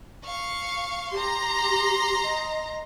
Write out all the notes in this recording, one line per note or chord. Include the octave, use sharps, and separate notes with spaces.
F5 C#6
G4 A#5 C6
D#5